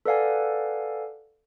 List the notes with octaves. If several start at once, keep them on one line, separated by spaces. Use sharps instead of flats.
A4 B4 D5 F5 F#5 G#5